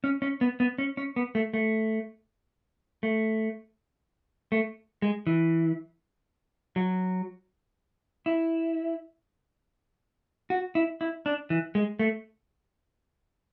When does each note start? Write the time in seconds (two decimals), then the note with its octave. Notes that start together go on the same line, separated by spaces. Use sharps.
0.04 C#4
0.22 C#4
0.41 B3
0.60 B3
0.78 C#4
0.97 C#4
1.16 B3
1.35 A3
1.54 A3
3.03 A3
4.52 A3
5.02 G#3
5.27 E3
6.76 F#3
8.26 E4
10.50 F#4
10.75 E4
11.01 E4
11.26 D4
11.50 E3
11.75 G#3
11.99 A3